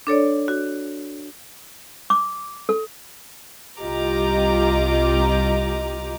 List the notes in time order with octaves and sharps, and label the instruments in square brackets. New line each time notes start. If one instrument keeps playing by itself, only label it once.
[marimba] D4 A4 C#5 D5
F#4
[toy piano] D6
A4
[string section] C2 F4 G4 D#5 A#5 D6